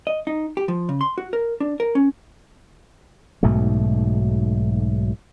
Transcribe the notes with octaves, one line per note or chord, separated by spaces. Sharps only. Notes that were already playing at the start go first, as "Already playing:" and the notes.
D#5
D#4
G4
F3
C#3
C6
F#4
A#4
D4
A#4
C#4
B1 G#2 B2 A3